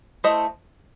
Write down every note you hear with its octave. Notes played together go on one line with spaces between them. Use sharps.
A3 E4 A4 C5 D#5